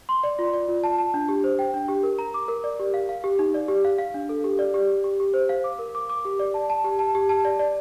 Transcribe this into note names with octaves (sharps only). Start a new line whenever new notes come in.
C6
D5
F4
D5
F4
A5
A5
D4
G4
C5
G5
D4
G4
A#4
A#5
D6
A#4
D5
G4
F5
F5
G4
D#4
D5
G4
F5
F5
D4
A4
G4
D5
G4
G4
G4
G4
C5
F5
D6
A#4
D6
D6
G4
D5
A5
A5
G4
A5
G4
A5
D5
D5